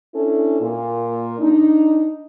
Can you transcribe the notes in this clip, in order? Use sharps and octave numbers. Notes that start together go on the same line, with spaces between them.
C#4 D4 E4 A4
A#2
D4 D#4